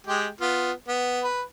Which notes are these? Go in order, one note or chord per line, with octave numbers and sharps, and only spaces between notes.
G#3 G4 G5
B3 F4
B3
B4